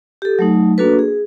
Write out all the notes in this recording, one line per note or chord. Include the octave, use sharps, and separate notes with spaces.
G4 A4
F#3 A3 D#4
A#3 D4 F#4 A4 B4
G#4